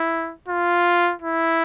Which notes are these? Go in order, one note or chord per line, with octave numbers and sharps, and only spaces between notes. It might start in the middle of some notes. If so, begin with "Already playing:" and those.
Already playing: E4
F4
E4